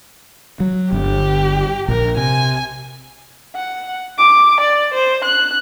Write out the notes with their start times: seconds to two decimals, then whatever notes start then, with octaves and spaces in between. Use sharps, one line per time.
0.60 F#3
0.92 G1 D3 G4
1.88 A#1 A#4
2.17 C3 G#5
3.56 F#5
4.18 D6
4.60 D5
4.94 C5
5.24 F#6